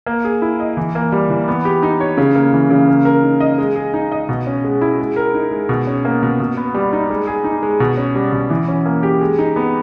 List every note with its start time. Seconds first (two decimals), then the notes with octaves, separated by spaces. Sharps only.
0.06 A#3
0.25 G#4
0.42 E4
0.60 D#5
0.77 E3
0.95 A#3
1.12 G3
1.30 E3
1.48 B3
1.65 G4
1.83 D#4
2.00 C#5
2.17 C#3
2.35 A#3
2.53 E3
2.70 C#3
2.88 A#3
3.05 A#4
3.23 D#4
3.40 D#5
3.58 G#3
3.75 G#4
3.94 D#4
4.12 D#5
4.29 B2
4.47 C#4
4.64 G#3
4.81 E4
4.98 G#3
5.16 A#4
5.34 D#4
5.51 G#3
5.69 B2
5.87 C#4
6.05 A#3
6.23 B2
6.40 B2
6.57 B3
6.74 G3
6.93 D#4
7.10 G#3
7.27 G#4
7.44 D#4
7.63 G#3
7.80 B2
7.97 C#4
8.15 G3
8.32 B2
8.50 E3
8.68 C#4
8.86 A#3
9.03 G4
9.21 G#3
9.39 D#4
9.56 B3